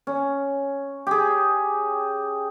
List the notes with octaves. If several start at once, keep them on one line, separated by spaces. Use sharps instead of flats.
C#4
G4 G#4